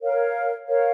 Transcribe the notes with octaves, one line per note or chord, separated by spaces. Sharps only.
A#4 C#5 F5
A#4 C#5 F5